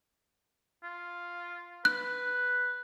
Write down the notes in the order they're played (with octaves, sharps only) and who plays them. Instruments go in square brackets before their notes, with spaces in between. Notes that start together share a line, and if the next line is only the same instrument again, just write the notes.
[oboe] F4
[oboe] B4 [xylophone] F#6